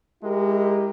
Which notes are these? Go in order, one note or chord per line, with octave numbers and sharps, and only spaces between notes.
G#3 E4 G4 A#4